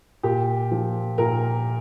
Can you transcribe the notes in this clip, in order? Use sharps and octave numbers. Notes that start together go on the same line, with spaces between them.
A#2 G4
F3
A#2 A#4